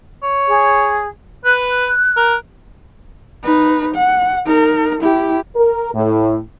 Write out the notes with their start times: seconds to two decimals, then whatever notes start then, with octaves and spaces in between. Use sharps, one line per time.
0.23 C#5
0.48 G#4
1.45 B4 F#6
2.17 A#4
3.43 D#4 B4
3.95 F#5
4.46 D#4 A#4
5.01 E4 G4
5.56 A#4
5.94 A2